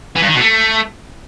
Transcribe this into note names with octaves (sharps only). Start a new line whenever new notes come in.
E3
G2
D#3
B2
A3